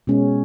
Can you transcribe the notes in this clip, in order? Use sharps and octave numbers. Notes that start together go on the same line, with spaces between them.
B2 G#3 C#4